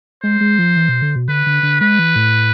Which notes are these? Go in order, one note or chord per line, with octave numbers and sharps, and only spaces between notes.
G#3 C5
G#3
F3
E3
B2
D3
B2
D3 B4
D3
D3
G#3 B4
E3
A2